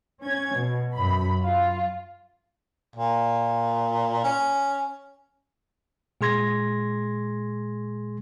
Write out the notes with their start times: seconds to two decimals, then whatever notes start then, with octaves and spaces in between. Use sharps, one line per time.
0.24 C#4 G#6
0.57 B2
0.95 F#2 B5
1.42 F4
2.96 A#2
4.24 C#4
6.21 A#2 G#3 G#4 C6 G#6 A#6